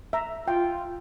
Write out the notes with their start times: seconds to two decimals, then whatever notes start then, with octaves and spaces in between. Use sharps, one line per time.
0.13 E5 A#5
0.48 F4 G5